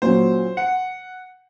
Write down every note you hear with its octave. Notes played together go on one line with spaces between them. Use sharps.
A#2 F#3 C#4 F4 C5
F#5